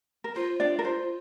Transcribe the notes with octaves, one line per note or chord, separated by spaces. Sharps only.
A#4
F4 C5
D4 D5
A#4
C5